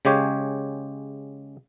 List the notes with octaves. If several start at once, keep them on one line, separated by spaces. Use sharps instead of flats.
C#3 G#3 G4 C#5